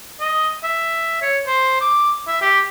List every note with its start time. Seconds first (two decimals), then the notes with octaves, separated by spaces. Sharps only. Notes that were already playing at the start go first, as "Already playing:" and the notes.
0.20 D#5
0.64 E5
1.22 C#5
1.47 C5
1.81 D6
2.28 E5
2.41 G4